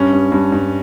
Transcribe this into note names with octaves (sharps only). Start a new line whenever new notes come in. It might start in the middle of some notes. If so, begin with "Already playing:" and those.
Already playing: G2 C#4
G2
G2
G2